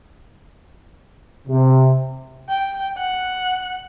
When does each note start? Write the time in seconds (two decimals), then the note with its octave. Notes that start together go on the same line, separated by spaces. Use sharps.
1.48 C3
2.49 G5
2.98 F#5